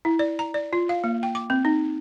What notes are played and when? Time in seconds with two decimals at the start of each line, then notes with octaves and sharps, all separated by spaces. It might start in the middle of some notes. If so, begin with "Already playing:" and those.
0.05 E4
0.19 D5
0.39 A#5
0.54 D5
0.73 F4
0.89 F5
1.04 A#3
1.23 G5
1.35 D6
1.50 C4
1.65 D#4